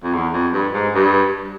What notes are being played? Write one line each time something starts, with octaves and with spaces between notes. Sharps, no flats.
F2
E2
F2
G2
G#2
G2